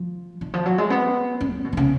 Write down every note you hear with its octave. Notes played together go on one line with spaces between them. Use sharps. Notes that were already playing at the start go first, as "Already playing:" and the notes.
Already playing: F3
D#3
F3
F#3
G#3
B3
C#4
D#3
B2
D#3
C#3